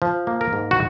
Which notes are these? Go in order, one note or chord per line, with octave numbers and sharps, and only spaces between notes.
F3
A#3
A#4
G#2
F#4